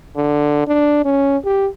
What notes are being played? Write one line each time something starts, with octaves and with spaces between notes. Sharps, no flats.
D3
D4
C#4
G4